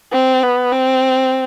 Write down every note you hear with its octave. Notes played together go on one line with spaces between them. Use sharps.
C4
B3
C4